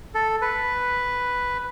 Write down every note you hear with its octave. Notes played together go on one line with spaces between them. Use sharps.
A4
B4